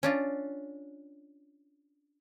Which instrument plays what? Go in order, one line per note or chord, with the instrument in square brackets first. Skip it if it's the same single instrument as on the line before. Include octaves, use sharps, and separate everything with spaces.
[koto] C#4 D4 F4